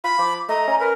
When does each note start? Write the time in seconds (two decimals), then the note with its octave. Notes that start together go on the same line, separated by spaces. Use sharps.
0.04 F4 B5
0.19 F3 D6
0.49 A3 D#5 A#5
0.67 C#4
0.80 A#4 B4